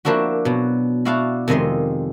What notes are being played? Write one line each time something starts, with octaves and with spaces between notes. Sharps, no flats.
F3 A#3 D4 E4 F#4
B2 F#3
E4 F#4 D5 F5 F#5 A5
F2 C3 D#3 G#3 D#5 C6